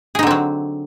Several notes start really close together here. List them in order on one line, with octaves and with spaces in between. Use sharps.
G#4 D#4 D3 C4 F#3